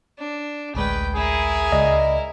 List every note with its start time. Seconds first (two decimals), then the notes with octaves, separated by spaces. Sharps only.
0.18 D4
0.75 A1 D2 G#3 B4 G5
1.16 E4 G#4 A#4
1.72 C#2 D5 D#5